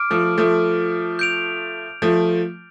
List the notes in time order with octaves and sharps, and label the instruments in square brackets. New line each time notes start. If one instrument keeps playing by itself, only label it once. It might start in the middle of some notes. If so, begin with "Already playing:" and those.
Already playing: [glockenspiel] D6 F6 D7
[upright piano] F3 A3
F3 A3
[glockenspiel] G6 D7 F7
[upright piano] F3 A3